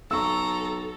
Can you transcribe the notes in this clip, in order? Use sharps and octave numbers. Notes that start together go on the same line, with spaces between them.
B1 A4 A#5 C#6 E6